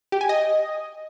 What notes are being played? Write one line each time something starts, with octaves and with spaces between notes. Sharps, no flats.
G4
G#5
D#5